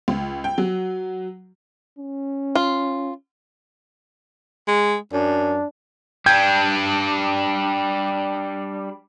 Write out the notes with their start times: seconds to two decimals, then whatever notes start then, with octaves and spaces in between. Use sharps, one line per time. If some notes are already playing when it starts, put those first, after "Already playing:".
0.08 C#2
0.44 G5
0.58 F#3
1.99 C#4
2.55 F4
4.68 G#3
5.13 F#2 D4
6.26 G3 D4 G5 G6 G#6